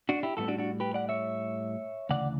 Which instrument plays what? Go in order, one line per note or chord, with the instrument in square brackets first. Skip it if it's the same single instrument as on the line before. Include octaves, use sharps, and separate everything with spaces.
[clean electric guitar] D4 F#4
E4 G4
A2 G3 B3 F#4 A4
D4 F#4
D4 F#4
G4 B4
D5 F#5
C#5 E5
D2 C#3 E3 D5 F#5